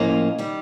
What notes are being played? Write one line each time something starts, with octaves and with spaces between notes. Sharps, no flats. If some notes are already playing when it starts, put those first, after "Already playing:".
Already playing: A2 F3 A#3 C#4 D#5
D#3 G3